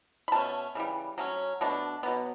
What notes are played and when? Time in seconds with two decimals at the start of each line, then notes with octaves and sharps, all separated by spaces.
0.28 B5
0.32 B2 A3 C#4 A5
0.75 C#3 E3 G3
1.18 F#3 A3 C#4
1.61 B2 A3 D4
2.03 B2 F#3 B3